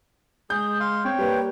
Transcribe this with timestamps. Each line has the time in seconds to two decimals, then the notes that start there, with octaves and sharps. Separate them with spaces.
0.50 G#3 G#4 G6
0.80 F5 C6
1.05 C4 C#5 G5
1.19 G3 A#3 B4